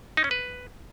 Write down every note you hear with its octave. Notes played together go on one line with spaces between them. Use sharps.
D#4
C#4
B4